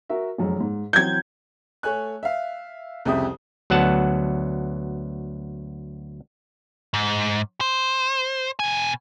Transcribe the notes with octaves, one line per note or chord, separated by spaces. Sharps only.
F#4 A#4 E5
F1 F#2 G#3
G#2
E3 F#3 C4 G6 G#6
A3 C#5 G#5 F#6
E5 F5
C2 F2 C#3 G4 E5 D#6
D2 F#3 B3 F#5 A5
G#2
C5
B2 G#5